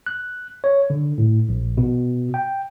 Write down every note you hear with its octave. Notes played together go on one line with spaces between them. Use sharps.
F#6
C#5
D3
A2
A#1
B2
G5